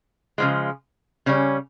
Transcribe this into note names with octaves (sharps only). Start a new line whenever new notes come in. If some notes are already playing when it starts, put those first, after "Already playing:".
C#3 F3 G#3
C#3 G3 C#4